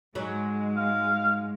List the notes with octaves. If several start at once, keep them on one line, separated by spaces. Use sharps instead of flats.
G#2 F#3 G#3
F5